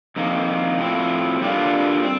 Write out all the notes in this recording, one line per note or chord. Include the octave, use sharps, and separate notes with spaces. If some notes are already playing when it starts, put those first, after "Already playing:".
F2 D#3 A#3
A2 F3 C4
D3 G3 A#3 D4 F4
C4